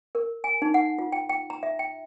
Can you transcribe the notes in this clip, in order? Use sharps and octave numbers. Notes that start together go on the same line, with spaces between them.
A#4
G#5
D#4
F#5
F4
G5
G5
A#5
E5
G5